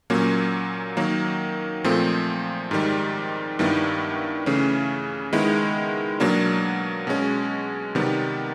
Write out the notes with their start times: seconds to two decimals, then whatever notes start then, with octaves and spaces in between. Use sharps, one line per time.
0.10 A#2 F#3 A#3 C#4
0.97 D#3 F#3 A#3
1.84 A#2 F3 A3 C4
2.71 G#2 D#3 G3
3.59 G2 D#3 G3 B3 E4
4.46 C#3 E3 A3 C#4
5.33 D#3 G#3 B3 E4
6.20 B2 F#3 A#3 D4
7.07 B2 G#3 C#4
7.95 C3 D#3 G3 B3